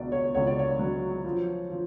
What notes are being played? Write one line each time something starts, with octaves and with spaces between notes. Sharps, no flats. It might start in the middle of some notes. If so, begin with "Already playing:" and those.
Already playing: C#2 B2 D5
C#5
C#2 C#5
D5
C#5
F#3
F3
F3